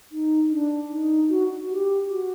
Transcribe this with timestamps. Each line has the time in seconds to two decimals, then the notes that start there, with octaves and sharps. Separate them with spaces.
0.12 D#4
0.52 D4
0.91 D#4
1.30 F#4
1.69 G4
2.08 F#4